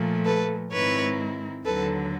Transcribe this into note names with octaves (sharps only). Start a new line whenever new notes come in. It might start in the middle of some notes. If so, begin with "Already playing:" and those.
Already playing: A#2 F3 A3
A4 B4
G#2 D#3 G#3 C4 E4 B4 C#5
D#2 D3 F#3 A4 B4